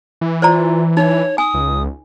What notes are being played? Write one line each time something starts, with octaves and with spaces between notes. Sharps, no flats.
E3
F4 C5 D5 A#5
D#4 C#5
G#5 D#6
C#2